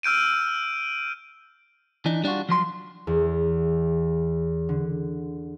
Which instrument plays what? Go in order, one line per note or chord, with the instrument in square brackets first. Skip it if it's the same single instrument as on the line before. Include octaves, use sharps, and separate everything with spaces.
[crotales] E6 F6 G6 D7 D#7
[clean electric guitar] E3 D4 D#4
G3 D4 D#4 F4 F#4
F3 F#3 C6
[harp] E2
D3